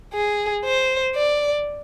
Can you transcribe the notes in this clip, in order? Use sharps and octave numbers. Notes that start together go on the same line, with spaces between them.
G#4
C5
D5